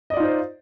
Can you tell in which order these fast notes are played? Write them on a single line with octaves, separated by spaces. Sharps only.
D#5 D5 F4 D#4 C5